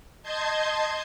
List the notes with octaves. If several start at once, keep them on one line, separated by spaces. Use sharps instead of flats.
D#5 A5 C6 G6 G#6